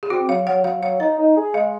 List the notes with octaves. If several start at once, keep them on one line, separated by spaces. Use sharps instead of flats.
G#4
C4 F#4
F#3 F5
F#3 F#5
F#3 F5
F#3 F5
D#4 C#5
D#4
G#4
G#3 F5